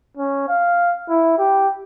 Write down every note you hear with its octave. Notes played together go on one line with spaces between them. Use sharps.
C#4
F5
E4
G4